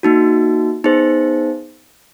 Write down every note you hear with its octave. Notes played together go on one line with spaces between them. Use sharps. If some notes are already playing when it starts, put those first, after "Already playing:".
A#3 D#4 F#4
B3 D#4 G#4 C5